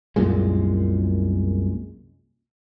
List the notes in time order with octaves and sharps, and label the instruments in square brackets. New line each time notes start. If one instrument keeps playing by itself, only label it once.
[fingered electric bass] C2 F#2 A#2 G#3